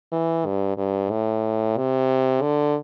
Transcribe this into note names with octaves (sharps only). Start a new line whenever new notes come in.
E3
G2
G2
A2
C3
D3